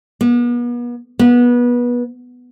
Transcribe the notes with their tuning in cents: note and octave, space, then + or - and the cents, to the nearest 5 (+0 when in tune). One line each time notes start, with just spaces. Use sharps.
B3 -40
B3 -25